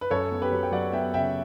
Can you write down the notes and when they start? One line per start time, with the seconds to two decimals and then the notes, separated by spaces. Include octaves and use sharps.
0.01 B4
0.11 F#2 A4 C#5
0.32 B3
0.42 G4 B4
0.52 F#3
0.63 G5
0.72 F#3 D5 F#5
0.92 B3 E5 G5
1.14 C#3 E5 G5